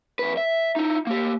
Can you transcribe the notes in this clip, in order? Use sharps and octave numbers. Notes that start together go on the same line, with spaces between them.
F2 B4
E5
D#4 E4
A#3 G4